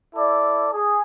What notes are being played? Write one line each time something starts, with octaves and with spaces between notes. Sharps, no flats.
E4 A4 D5
G#4